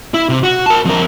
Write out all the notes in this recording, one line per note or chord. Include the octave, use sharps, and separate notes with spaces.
E4
C3
F#4
A#4 A5
F2 A#4